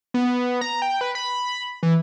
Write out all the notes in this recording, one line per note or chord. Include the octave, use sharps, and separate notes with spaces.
B3
A#5
G5
B4
B5
E3